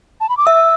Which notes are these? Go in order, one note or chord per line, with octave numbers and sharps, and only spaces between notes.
A5
B5
D6
E5 E6